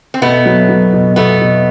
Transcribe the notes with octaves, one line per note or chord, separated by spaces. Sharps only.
C4
B2 A3 B3
F#3
F#3
B2
B2 A3 B3
B2